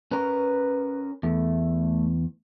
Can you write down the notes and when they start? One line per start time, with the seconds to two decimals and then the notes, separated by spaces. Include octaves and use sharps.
0.11 C#4 A#4 B4
1.23 E2 A3